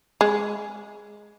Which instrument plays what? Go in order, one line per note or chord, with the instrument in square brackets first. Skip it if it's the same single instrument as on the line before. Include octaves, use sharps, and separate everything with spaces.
[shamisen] G#3